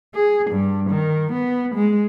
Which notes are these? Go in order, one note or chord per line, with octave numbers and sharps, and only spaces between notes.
G#4
G2
D#3
B3
G#3